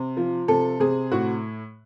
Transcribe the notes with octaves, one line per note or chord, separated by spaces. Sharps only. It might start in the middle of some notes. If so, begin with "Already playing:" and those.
Already playing: C3
F3
C3 A4
C3 G#4
A2 F#4